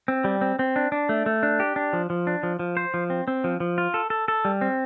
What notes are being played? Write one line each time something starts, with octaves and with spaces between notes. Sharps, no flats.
C4
G3
C4
C4
D4
D4
A3
A3
D4
G4
D4
F3
F3
D4
F3
F3
C5
F3
C4
C4
F3
F3
F4
A4
A4
A4
G3
C4